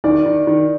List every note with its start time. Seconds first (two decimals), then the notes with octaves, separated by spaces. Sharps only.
0.04 D#3 D5
0.26 D#3
0.47 D#3